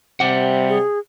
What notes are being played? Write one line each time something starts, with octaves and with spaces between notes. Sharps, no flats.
C3 G3 G4 F#5
G#4